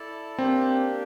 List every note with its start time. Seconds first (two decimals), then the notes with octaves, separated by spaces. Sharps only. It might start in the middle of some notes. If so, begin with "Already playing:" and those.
Already playing: E4 A4 D5 A5
0.39 A#3 C4 D4 G4